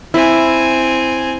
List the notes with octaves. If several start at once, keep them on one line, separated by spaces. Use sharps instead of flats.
C4 E4 G#5